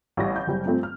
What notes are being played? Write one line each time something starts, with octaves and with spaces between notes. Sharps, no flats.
A1 G3 A#6
G6
F#1 G3
G2 F3 A3 C4
F6